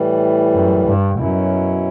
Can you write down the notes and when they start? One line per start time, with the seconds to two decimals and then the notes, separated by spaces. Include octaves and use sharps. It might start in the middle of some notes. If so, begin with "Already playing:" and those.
Already playing: A2 E3 G3
0.55 F#2
0.87 G2
1.19 F#2 B2 F#3 C#4 E4